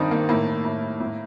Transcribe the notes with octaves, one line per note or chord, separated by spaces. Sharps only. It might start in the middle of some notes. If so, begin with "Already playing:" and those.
Already playing: G2 D#3 C4 D4 D#4
A#3
A2 A#3
A2
A2